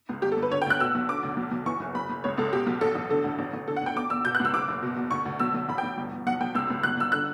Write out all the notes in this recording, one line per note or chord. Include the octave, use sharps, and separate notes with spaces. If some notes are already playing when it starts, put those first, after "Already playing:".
C#2
G1 G4
A4
G1
B4
D3 C#5
G5
D2 F#6
B2 E6
B1
D3 D6
D2
B1
B1
E3 C#6
F#1
F#1 B5
F#1
C#2 C#5
C#2 A4
B2 G4
B1
A1 A4
A1
D3 A4
D2
A1
A1
D3 A4
F#5
D2 G5
E2 D6
E2 E6
B2 G6
F#6
C#2
E6
F#1 D6
F#1
B2
E2
D2 C#6
D2
B1 E6
B1
A1 B5
G5
A1
G1
G1
B1 F#5
B1 G5
C#2 E6
C#2
G1 F#6
G1 E6
D3 F#6